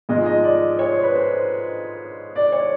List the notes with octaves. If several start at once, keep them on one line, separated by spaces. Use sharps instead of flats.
G#2 F3 G#3 D#5
D#5
D5
C#5
C5
B4
C5
D5
C#5